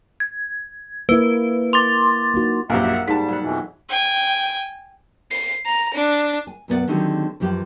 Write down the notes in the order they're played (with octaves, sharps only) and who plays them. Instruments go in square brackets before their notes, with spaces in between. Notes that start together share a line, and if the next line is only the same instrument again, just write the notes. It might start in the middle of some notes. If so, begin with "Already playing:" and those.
[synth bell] G#6
[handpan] A#3 E4 [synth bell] B4
[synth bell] C6 D6 A6
[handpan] A#3 D#4 F#4
[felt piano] A#1 F#2 [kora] A#3 G4 [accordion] E5 F#5
[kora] F#4
[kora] G#2 [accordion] G3 [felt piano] A5 B6
[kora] F#3 F#5
[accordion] F2 B2 E3
[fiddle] G5 G#5
[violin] C7
A#5
D4
[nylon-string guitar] G#5
F#2 B2 B3 D4 D5 F#5
D3 D#3 F#3 G#3 C4 G4
F#2 E3 F3 G4